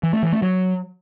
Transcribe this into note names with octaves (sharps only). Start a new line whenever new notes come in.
E3
A3
E3
A3
F#3